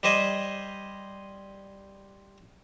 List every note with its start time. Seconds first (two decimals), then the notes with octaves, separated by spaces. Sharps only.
0.03 G3 G4 C5 D#5 G#5